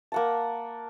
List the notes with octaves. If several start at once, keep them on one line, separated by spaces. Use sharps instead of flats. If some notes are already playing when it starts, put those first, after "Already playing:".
A#3 F#5 A5